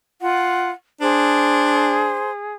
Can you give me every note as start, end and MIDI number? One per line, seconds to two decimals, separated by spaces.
0.22 0.71 65
0.22 0.70 78
1.01 2.21 62
1.01 2.54 68
1.01 2.31 72